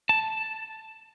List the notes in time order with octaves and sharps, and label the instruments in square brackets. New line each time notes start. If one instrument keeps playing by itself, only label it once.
[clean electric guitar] A5